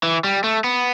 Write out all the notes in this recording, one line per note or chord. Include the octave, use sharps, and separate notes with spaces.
E3
G3
A3
B3